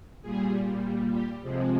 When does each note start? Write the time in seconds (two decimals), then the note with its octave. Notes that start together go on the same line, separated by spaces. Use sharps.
0.22 A#2 G3 G#4
1.12 G4
1.42 F2 C3 F3 G#3